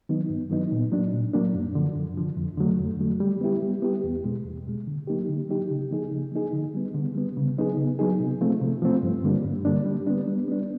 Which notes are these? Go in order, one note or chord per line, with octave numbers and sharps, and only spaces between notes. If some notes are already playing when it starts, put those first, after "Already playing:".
D#3 F#3 B3 D#4
G2
D#3 F#3 B3 D#4
A#2
F#3 A#3 D4
A#2
F#3 A#3 D4
F#2
D3 F3
F#2
D3 F3
F2
D3 F#3 A3
F2
D3 F#3 A3
G3
B3 E4 G4
G3
B3 E4 G4
E2
B2 G#3
E2
B2 G#3
D3
F#3 A#3 D#4 G4
D3
F#3 A#3 D#4 G4
C#3
F3 A#3 D#4 G#4
C#3
F3 A#3 D#4 G#4
D3
G3 B3
D3
G3 B3
C#3
F#3 B3 D#4 G#4
C#3
F#3 B3 D#4 G#4
C3
F3 A3 C4 F4
C3
F3 A3 C4 F4
G2
D3 G3 A#3 D4
G2
D3 G3 A#3 D4
G3
B3 D4
G3
B3 D4